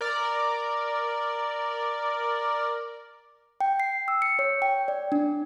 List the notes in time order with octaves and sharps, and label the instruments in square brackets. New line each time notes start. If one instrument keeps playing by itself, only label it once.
[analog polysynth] A#4 D5
[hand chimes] G5
C7
E6
C#7
C#5
G5
D5
D4